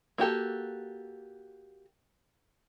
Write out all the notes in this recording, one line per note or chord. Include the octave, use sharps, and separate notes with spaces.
A#3 F#4 G4 A4